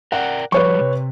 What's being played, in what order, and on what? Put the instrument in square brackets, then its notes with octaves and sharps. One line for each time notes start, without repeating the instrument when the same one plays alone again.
[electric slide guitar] A#4 D5 G5 [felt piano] F#5
[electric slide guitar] F3 G3 [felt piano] B4 C#5 C#6
[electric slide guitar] C3